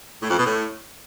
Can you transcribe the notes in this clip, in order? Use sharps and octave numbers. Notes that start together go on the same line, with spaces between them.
A2
F2
B2
A2